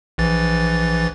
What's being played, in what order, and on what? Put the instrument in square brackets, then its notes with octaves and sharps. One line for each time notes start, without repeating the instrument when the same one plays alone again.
[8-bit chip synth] A#1 E3 A6